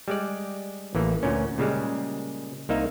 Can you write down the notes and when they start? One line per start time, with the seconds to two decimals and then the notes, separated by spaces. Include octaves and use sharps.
0.08 G3 G#3 D5
0.95 A1 E3 A#3
1.23 D2 A#2 C#4
1.58 A#2 C#3 G3 G#3
2.69 C2 A#3 D#4 E5 F5